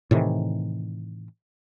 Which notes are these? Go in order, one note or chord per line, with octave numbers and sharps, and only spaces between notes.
A2 C3 D#3 E3